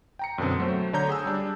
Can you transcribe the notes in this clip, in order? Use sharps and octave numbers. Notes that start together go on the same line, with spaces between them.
G5 A#5 C#7
F#2 B2 D3 C4
F#3 A3 C5
D3 C#5 A#5 G6
G#4 G#5 E6
G3 D4